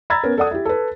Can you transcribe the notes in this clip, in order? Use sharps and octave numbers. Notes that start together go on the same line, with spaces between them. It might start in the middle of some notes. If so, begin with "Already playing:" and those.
A#5 B5 E6 G#6 A6
B3 C#4 A#4
A4 D5 F#5 D#6
E4 G4
A4 B4